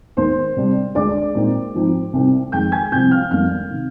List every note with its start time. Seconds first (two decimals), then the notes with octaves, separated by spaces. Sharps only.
0.17 D#2 D#3 A#3 C5 C6
0.56 C3 G3 D4
0.95 D2 D3 G#3 D4 D5 D6
1.35 A#2 G#3 C4 D#4
1.74 G#2 F3 C4 D#4
2.13 C2 C3 G3 C4 D#4
2.52 F2 D#3 G#3 D#4 G5 G6
2.72 G#5 G#6
2.92 C2 C3 F3 C4 G5 G6
3.11 F5 F6
3.31 F2 D#3 G3 A#3 D4 F5 F6
3.70 C3 D#3